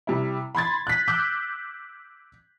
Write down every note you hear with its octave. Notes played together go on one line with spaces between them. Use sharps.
C3 G3 E4
B5 C6 G#6 A6
F#6 B6
D6 E6 F#6 G6